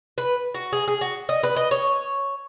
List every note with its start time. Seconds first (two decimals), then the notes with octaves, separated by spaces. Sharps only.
0.18 B4
0.54 F#4
0.73 G#4
0.88 G#4
1.01 F#4
1.29 D#5
1.43 B4
1.56 D#5
1.71 C#5